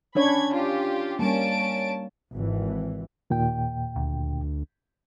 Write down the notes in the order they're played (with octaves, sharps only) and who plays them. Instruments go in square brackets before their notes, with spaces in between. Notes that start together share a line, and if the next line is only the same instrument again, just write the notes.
[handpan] C#4 D4 C#5 [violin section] B5 G#6
[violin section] F4 G4
[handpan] G3 A#3 [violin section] C#4 A5 D7
[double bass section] G#1 E3
[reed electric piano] D#2 A#2 G5
[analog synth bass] D2